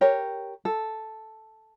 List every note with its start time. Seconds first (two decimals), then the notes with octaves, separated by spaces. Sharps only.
0.01 G4 A#4 C#5
0.65 A4